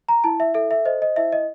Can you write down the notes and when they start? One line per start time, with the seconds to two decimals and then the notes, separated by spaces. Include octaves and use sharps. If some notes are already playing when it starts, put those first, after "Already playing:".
0.09 A#5
0.24 E4 A5
0.40 E5
0.54 A4 E5
0.71 E5
0.85 C5 D#5
1.02 D#5
1.16 E4 E5
1.32 D#5